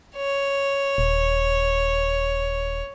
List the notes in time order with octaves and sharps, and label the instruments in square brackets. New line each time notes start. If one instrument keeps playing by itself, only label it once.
[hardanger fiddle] C#5
[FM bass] D#1